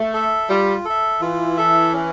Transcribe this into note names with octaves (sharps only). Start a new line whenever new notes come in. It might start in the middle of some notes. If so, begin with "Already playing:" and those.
Already playing: A3
A4 E5
G3 F4
A4 E5
E3 F4
A4 E5
C#4